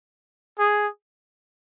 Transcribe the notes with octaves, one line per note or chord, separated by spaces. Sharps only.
G#4